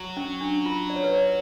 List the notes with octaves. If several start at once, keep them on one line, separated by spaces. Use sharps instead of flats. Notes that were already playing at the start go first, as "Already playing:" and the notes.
Already playing: F#3
C#4
D4
F4
D5
C#5
B4
C#5